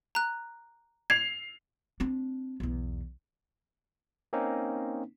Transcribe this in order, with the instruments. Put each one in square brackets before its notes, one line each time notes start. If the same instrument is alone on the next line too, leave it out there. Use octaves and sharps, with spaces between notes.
[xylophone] A#5 F#6
[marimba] G#6 [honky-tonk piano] C7 F7
[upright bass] C4 D4
B1 E2
[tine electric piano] A#3 C4 C#4 D#4